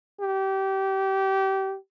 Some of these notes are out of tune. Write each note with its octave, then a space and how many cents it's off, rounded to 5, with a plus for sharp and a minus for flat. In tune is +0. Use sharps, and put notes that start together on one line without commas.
G4 -25